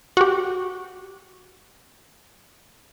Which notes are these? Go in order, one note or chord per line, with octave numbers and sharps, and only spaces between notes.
F#4 G4